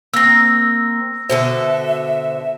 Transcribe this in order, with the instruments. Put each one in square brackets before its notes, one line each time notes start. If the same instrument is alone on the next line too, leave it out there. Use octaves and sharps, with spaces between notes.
[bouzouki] A#3 C4 [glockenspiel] E6 A#6
[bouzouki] B2 D3 A4 [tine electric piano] C5 [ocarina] E5